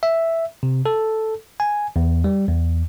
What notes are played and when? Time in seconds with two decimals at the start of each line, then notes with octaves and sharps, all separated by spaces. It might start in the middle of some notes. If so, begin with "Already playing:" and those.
0.03 E5
0.63 C3
0.86 A4
1.60 G#5
1.96 E2
2.24 G3
2.48 E2